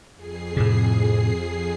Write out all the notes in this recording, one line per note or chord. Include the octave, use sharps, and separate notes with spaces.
F2 G#4 C7
A2 C3